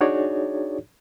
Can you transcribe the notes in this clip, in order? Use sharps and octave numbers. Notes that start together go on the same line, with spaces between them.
D4 D#4 F#4 G#4 C#5 D5